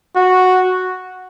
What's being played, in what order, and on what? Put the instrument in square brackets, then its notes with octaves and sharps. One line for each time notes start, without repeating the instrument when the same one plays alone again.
[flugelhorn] F#4